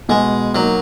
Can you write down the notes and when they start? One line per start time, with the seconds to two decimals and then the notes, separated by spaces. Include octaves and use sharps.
0.09 B2 G#3
0.54 F#3 A#3 D#4 F#4